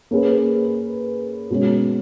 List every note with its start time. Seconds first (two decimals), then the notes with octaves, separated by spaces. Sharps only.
0.11 A#3 C#4 G#4 B4
1.50 B2 G#3 C#4